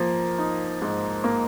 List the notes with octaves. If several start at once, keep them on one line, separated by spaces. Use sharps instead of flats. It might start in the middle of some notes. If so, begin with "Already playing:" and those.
Already playing: F3 A#3
D#4
G#2
A#3